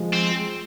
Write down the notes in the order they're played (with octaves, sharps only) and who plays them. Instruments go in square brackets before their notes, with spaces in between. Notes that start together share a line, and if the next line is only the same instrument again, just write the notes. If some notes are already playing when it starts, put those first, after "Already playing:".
Already playing: [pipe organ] F3 G#3
[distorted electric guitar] C4